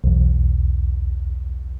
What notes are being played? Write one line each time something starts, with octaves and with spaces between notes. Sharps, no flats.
B1 E2